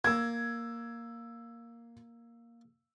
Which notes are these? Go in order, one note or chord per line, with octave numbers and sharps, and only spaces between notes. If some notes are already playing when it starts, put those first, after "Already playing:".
A#3 E6 G#6